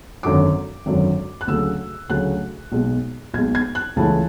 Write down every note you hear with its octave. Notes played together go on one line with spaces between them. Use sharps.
G#1 F#2 D3 F#3 D6
G#1 F#2 D3 F#3
F#6
D2 C#3 F#3 A3 E6
D2 C#3 F#3 A3 F#6
B1 B2 G#3
B1 B2 G#3 G#6
G#6
F#6
C#2 C#3 E3 A3 E4 A5